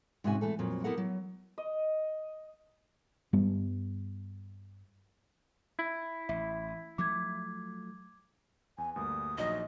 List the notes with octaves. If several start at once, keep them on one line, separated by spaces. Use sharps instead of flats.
G#2 C3 C#4 F#4 E5 G#5
E3 A3 A4
F2 A#2 F#3
B3 E4 G4 A4 A#4 F#5
F#3
D#5
G2 G3 B3
E4
A1 E5
F3 F#3 A3 D6 G#6
E2 G#5
D2 G2 A#3 D#6
A#1 F#3 D#4 D#5